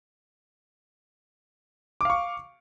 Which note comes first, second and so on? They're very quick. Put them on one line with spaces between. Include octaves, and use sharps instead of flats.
D6 F5 C#6